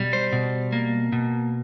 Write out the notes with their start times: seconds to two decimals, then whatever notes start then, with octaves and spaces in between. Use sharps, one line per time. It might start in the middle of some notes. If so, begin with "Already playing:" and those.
Already playing: B2 G3
0.13 C5
0.32 B2
0.72 A#3
1.12 B2